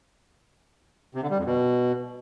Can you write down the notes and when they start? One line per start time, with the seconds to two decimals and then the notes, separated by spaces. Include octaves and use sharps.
1.15 C3
1.22 D3
1.30 G3
1.38 F2
1.46 B2